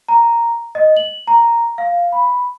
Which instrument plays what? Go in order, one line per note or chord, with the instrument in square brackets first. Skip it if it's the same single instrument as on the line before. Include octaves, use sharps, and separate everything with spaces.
[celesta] A#5
D#5
F#7
A#5
F5
B5